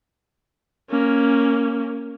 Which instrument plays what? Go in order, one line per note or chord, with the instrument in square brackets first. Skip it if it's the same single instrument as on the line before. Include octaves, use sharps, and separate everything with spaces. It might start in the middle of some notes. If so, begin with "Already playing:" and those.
[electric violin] A#3 C#4